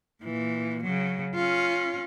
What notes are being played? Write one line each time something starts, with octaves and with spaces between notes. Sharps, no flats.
A#2 E3
C#3 F#3
C#4 F4